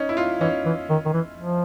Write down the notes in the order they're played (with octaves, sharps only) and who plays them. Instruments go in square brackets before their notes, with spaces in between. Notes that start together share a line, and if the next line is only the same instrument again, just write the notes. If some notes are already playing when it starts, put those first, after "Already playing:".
Already playing: [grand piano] C#4 D#4
E4
D#4 F4
[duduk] E3 [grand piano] C#4 D#4
[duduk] E3
D#3
D#3
E3
F3